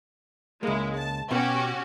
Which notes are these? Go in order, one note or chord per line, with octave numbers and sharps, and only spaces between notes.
C#2 G#3 A#3 E4
A5
B2 B3 C#4 F#4 G4